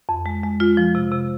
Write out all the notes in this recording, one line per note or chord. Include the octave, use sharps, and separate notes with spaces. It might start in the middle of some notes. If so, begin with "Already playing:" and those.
F2
G#3
G#3
G#3 F4
F3
C3
C3